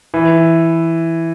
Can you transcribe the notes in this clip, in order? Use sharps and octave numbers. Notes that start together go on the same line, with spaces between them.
E3